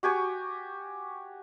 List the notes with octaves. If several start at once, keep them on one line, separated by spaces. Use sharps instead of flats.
F#4 G4 G#5 C#6